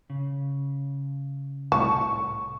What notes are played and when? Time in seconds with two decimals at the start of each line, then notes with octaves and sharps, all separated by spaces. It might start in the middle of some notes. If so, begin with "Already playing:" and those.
0.10 C#3
1.72 C2 A2 A5 C#6